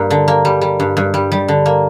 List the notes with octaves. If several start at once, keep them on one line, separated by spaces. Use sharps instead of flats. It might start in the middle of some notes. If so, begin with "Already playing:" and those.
Already playing: G2 A#3
D3
A#3
G3
G3
G2
G2
G3
G3
D3
A#3